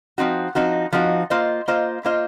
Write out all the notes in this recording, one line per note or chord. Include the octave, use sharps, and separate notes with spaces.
F3 C4 D#4 F#4
F3 C4 D#4 F#4
F3 C4 D#4 F#4
A#3 F4 C5 D#5
A#3 F4 C5 D#5
A#3 F4 C5 D#5